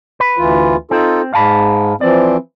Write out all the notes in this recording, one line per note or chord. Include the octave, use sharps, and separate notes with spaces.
B4
D2 E3 F4
C4 D#4 F4 A4
G#2 F5 A5 B5
E3 F3 C4 D5